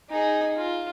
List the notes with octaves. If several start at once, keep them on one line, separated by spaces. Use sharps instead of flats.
D#4 G#4
F4